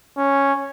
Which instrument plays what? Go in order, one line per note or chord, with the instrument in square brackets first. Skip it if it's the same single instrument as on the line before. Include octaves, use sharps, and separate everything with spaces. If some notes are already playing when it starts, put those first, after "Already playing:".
[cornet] C#4